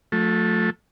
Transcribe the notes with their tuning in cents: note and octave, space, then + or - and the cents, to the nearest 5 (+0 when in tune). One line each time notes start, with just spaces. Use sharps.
F3 +45 A3 +0